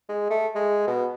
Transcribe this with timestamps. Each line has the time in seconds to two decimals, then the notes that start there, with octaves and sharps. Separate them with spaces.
0.09 G#3
0.30 A3
0.55 G#3
0.87 B2